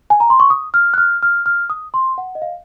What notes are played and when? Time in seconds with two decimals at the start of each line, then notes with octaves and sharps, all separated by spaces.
0.10 G#5
0.20 A#5
0.30 C6
0.40 C#6
0.50 D#6
0.74 F6
0.94 F#6
0.98 F6
1.23 F6
1.46 F6
1.70 D#6
1.94 C6
2.18 F#5
2.35 D#5
2.42 F5